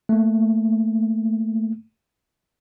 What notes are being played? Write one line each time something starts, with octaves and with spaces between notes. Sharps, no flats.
A3 A#3